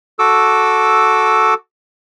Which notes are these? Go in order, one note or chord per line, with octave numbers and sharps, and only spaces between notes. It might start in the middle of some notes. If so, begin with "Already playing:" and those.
F#4 A4 D6 E6